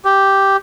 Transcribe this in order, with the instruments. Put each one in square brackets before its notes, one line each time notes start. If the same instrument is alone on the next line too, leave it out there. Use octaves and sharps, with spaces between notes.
[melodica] G4